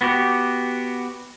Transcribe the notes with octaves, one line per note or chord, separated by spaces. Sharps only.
B3 F#4 G4